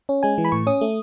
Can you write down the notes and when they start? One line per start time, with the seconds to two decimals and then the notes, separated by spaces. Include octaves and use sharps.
0.09 C#4
0.23 G#3 G#5
0.38 E3
0.45 B5
0.52 A2 C#6
0.67 C#4 D#6
0.81 A3